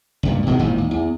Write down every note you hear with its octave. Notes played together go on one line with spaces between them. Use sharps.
C#2 G2 A#2
B2 D#3 G3 G#3
G#1 A#2 D#3 E3
D#2
E2